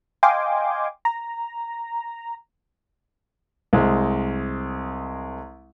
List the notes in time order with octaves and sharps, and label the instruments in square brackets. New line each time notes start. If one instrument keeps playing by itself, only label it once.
[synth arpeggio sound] D#5 F5 G5 G#5 C6 D6
A#5
[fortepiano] C2 G#3 C4